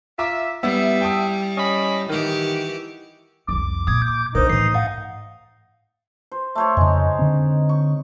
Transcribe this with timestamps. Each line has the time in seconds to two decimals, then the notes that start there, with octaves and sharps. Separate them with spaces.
0.19 F4 E5 A#5 D6
0.63 G3 B3 E4 E5
1.01 G5 A5 D#6
1.58 C#4 D#5 B5
2.10 D#3 E3 F#4 G4
3.48 C2 F2 D6
3.87 A#2 D#6 G#6
4.02 G6
4.35 C2 D3 D#4 A#4 C5
4.49 A2 E3 C7
4.74 G#2 F5 F#5
6.32 C5
6.55 A3 C5 C#5
6.77 F2 C#3 G#3 D#4
7.19 D3 C4
7.69 C#6